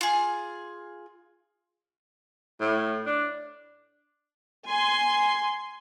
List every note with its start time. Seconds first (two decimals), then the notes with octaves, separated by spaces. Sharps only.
0.01 F4 G#4
2.61 A2
3.06 D4
4.66 G#5 C6